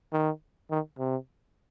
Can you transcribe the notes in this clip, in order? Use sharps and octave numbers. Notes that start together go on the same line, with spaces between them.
D#3
D#3
C3